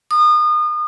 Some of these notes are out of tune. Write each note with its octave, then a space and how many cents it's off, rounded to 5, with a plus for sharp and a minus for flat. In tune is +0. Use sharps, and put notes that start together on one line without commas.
D#6 -35